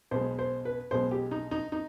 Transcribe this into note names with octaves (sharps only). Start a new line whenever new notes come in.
B1 B2 G#3 C5
C5
B4
B1 B2 G#3 C5
G4
D#4
D#4
D#4